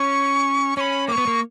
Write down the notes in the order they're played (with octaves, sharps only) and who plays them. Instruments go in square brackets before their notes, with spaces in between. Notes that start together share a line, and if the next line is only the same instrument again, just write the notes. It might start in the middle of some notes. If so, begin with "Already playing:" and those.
Already playing: [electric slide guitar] C#4 [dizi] C#6
[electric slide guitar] C#4 [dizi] B5 C#6
[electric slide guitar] A#3 [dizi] C#6 D6
[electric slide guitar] B3
A#3